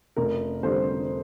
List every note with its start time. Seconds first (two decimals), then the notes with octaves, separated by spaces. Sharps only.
0.16 F1 A#4
0.63 F2 D3 G3 C5